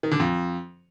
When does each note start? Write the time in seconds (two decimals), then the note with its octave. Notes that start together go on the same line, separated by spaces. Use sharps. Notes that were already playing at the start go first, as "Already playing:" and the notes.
0.03 D#3
0.11 D3
0.20 F2